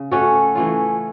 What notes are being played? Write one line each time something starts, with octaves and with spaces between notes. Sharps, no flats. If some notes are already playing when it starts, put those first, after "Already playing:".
Already playing: C#3
A3 C#4 F#4 A4
E3 A3 C#4 F4